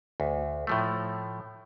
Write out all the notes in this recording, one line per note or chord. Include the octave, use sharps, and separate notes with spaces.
D2
A2 F3 A3